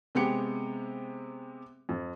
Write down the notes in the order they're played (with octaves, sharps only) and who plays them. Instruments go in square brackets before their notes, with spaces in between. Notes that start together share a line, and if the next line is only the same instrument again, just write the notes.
[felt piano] C3 G#3 B3 G4 C#7
F2